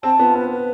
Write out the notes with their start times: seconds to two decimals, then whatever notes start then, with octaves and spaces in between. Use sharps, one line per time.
0.03 C4 A5
0.19 B3 F4
0.35 C4 B4
0.50 B4